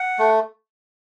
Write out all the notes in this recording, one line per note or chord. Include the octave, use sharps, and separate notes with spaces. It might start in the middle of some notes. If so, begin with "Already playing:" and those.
Already playing: F#5
A3